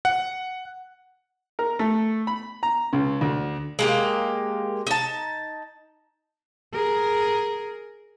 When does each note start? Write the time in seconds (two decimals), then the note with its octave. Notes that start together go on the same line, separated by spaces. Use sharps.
0.05 F#5
1.59 A#4
1.79 A3
2.27 B5
2.63 A#5
2.93 C#2
3.21 D2
3.79 G#3 A#3 G4
4.87 D#4 A5
6.73 G#4 A#4